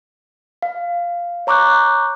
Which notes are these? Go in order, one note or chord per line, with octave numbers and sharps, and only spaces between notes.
F5
C#5 A#5 C#6 D6 F#6 G6